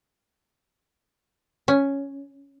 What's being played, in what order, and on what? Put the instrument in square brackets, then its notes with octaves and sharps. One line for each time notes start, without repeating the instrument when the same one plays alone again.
[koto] C#4